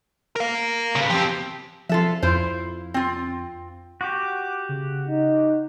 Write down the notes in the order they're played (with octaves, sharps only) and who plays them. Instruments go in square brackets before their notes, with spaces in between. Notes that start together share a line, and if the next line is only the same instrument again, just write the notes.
[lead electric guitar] A#4 F5
[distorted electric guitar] C#3 B3
[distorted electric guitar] F3 C4 [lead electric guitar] G4
[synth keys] F3 C4 [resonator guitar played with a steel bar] F4 A4 E5
[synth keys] F2 [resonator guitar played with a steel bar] E4 F4 C5
[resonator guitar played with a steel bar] C4 F4
[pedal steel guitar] F#4 G4 [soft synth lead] D6
[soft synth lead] C#3
[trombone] D#4